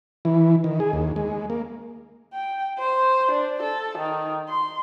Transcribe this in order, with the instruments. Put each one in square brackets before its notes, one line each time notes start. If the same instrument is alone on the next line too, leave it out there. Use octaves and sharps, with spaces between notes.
[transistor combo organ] E3
D#3
G#4
D#2
G#3
A#3
[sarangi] G5
C5
D4
A4
D#3
C6